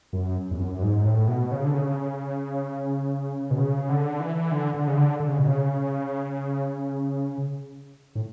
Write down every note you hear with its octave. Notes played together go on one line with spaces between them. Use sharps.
F#2
E2
F#2
G#2
A2
B2
C#3
D3
C#3
B2
C#3
D3
E3
D3
D3
C#3
D3
D3
C#3
B2
C#3
A2